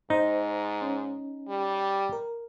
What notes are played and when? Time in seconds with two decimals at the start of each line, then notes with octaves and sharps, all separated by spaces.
0.10 G#2 D#4 C5 D#5
0.82 C#4
1.49 G3
2.13 A#4